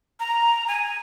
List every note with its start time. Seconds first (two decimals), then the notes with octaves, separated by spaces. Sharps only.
0.20 A#5
0.68 G#5